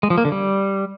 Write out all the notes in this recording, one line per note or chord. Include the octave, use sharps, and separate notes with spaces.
G#3
F3
A#3
D3
G3